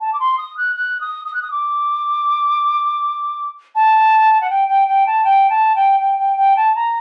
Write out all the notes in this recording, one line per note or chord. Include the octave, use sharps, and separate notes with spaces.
A5
D6
C6
D#6
F#6
F#6
D#6
D#6
F#6
D#6
D6
A5
F#5
G5
G5
G5
A5
G5
A5
G5
G5
G5
G5
A5
A#5